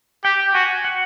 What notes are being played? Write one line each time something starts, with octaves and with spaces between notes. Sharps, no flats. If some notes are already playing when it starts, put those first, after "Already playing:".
G4 G5
F#4 G#5
F#5